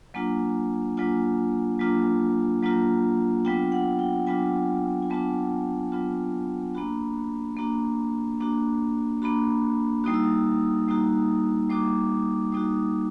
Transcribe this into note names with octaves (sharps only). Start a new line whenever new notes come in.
F#3 A#3 D4 F4 G#5
F#3 A#3 D4 F4 G#5
F#3 A#3 D4 F4
F#3 A#3 D4 F4
F#3 B3 D4 F4 G5
F#5
G5
F#3 B3 D4 F4 G#5
G#5
F#3 B3 D4 F4 A5
F#3 B3 D4 F4
A#3 D4 F#4 B5
A#3 D4 F#4
A#3 D4 F#4
A#3 D4 F#4 B5
G3 A#3 D#4 F#4 D#6
E6
D#6
G3 A#3 D#4 F#4
G3 A#3 D#4 F#4 D6
G3 A#3 D#4 F#4 D#6